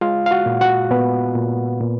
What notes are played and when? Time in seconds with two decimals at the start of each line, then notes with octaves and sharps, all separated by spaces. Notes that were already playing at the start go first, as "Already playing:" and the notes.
0.01 G#3 F4 F5
0.26 F5
0.31 F#4 F#5
0.46 A#2
0.61 F#4 F#5
0.91 A#2 B3 B4
1.35 A#2
1.81 A#2